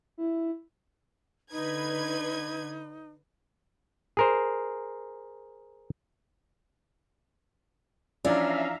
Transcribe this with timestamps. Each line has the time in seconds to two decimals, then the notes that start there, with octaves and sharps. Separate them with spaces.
0.18 E4
1.52 D3 D#4 B4 G#6
4.17 G#4 A#4 C5
8.25 E3 F3 C#4 D4 D5 E5 F5 A#5